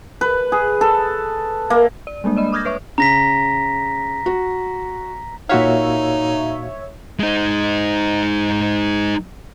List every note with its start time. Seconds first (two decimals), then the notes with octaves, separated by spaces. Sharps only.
0.21 B4
0.52 G#4
0.81 A4
1.70 A#3
2.07 D5
2.24 G3 G#3 A#3 D4
2.37 D5 D#5 B5
2.52 D6 D#6 F6 G6 G#6 A#6
2.65 B4 C#5 E5 C#6
2.98 C#3 A#5 A#6 B6
4.26 F#4
5.49 A#2 D#4 F#4 C#5 E5 F5
7.20 G#3 D#4